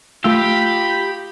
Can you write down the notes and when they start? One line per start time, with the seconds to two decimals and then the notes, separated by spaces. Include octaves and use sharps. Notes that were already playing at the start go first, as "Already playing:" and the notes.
0.24 A3 D#4 F4 G4 B5 E6